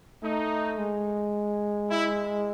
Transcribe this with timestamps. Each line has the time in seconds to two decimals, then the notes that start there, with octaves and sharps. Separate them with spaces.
0.23 A3 D#4
0.78 G#3
1.90 E4